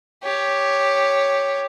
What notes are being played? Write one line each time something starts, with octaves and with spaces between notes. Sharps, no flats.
G4 C#5